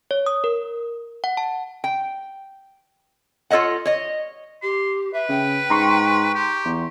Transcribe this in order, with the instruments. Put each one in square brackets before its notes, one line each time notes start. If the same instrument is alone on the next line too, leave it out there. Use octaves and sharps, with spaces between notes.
[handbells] C#5
D#6
A#4
F#5
A5
[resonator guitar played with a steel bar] G5
F4 A4 C#5 D#5 F#5
C#5 D#5
[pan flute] G4 [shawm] C6
[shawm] B4 [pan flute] E5
[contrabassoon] C#3 [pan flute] G5
[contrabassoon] G#2 [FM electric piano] A#5 C6 C#6
[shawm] G4
[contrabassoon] E2